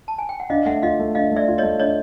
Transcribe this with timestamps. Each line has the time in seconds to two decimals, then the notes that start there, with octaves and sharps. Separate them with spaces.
0.08 A5
0.18 G#5
0.29 G5
0.40 F#5
0.50 D4 D#5 F5
0.66 A3 E5 F#5
0.83 F4 D#5 F5
0.99 A3
1.15 D4 D#5 F5
1.31 A3
1.36 D5 E5
1.48 F4
1.58 A3 C#5 D#5
1.79 D4 C#5 D#5